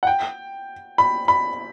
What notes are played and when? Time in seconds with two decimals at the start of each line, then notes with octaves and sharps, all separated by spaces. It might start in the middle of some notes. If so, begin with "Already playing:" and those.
0.03 F#5
0.07 G5
0.98 B5
1.28 B5